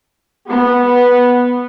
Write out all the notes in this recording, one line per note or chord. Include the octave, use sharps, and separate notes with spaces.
B3